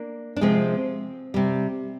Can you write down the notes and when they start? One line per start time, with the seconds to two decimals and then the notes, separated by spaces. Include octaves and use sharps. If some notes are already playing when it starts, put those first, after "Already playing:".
Already playing: A#3 D4
0.36 D4
0.41 C3 F3 G#3 C4
1.34 C3 G3